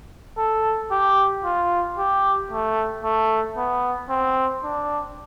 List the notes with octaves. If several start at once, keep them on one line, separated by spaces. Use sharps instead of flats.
A4
G4
F4
G4
A3
A3
B3
C4
D4